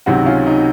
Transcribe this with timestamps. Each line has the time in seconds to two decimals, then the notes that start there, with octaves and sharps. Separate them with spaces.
0.06 C#2 C3 D#3 F#3 D#4 F#4
0.26 C#4 F4
0.46 D#4